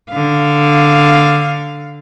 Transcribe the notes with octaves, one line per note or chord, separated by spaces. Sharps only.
D3 F5